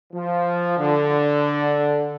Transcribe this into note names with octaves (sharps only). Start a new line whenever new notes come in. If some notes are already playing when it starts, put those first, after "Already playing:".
F3
D3